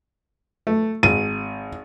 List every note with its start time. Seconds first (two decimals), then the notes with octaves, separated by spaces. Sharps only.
0.67 A3
1.03 G#1 D#7